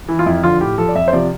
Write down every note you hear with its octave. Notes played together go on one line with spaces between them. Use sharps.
E3
F4
F2 E4
D3 F3 F4
A2 G4
F3 A4
D5
F2 E5
C5
C3 F3 D5